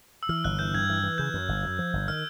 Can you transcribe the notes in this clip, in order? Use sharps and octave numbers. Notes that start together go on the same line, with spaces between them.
E6
E3 F6
G1 F#6
E3 G6
G2 G#6
E3
E3
C#3 G6
F#2
G1
F#2
F3
G1
D#3 F6